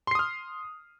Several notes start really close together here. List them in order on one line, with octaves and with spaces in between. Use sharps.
C6 C7 D#6 F6